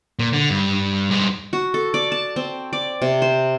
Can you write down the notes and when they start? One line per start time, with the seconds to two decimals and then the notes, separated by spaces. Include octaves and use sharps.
0.19 A#2
0.33 D3
0.50 G2
1.11 G2 G#3
1.53 F#4
1.74 A4
1.94 D5
2.12 A5
2.36 C4
2.73 D5
3.02 C3
3.22 C5